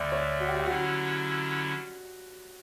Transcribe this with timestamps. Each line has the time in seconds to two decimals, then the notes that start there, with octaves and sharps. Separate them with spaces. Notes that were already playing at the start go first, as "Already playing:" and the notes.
Already playing: D2 D3 A3 D5 G5 B5
0.12 C#5
0.40 F#4
0.49 G4
0.59 G4
0.66 D3 F#3 C#4 E4 F#4